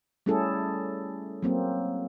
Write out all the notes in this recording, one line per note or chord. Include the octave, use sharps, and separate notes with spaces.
G3 A3 C#4 E4 G#4 A4
F#3 A#3 C4